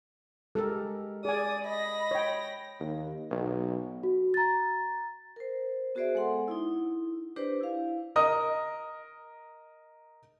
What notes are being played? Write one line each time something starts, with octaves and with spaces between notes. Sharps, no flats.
G#3 G4 A4 A#4
G#4 D5 G#5 D#6
D#5 B5 A#6
C#5 G5
D#2
B1
F#4
A#5 A6
A#4 C5
B3 F#4 G#4 C5 D5 E5
G#3 A4 F#5 C6
D#4 E4
D4 G4 B4 C5 D5
E4 F5
A#4 D#5 D#6